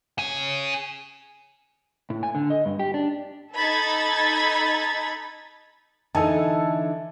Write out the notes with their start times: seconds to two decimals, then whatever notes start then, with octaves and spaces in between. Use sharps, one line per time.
0.19 C#4 G#4
2.10 A2
2.23 G#5
2.35 D3
2.50 D#5
2.66 G2
2.79 G4
2.94 D4
3.56 D#4 A4 B5 G#6 A6
6.15 D3 E3 D#4 A4 G#5 A5